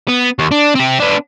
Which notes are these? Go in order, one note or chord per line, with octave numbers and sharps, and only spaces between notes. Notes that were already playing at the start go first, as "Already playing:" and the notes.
B3
D#2
D4
C4 G4
B3 D4